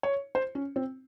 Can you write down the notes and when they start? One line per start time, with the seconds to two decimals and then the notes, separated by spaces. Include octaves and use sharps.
0.03 C#5
0.35 C5
0.55 C#4
0.76 C4